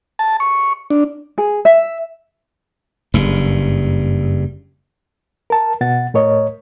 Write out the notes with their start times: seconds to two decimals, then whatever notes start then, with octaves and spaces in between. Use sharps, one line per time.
0.19 A5
0.40 C#6
0.90 D4
1.38 G#4
1.65 E5
3.14 F#1 G2
5.50 A#4 A5
5.81 B2 F#5 A6
6.14 A2 A#4 C#5 D#5